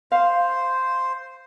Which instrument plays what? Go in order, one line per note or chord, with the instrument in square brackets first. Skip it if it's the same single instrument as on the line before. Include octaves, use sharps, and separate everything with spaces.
[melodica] C5 [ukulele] F5